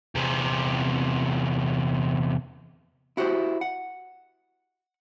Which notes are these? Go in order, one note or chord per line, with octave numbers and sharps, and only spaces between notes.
E2 C3
E4 F#4 G4 C5
F#5